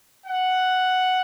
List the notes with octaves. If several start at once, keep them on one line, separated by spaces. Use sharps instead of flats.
F#5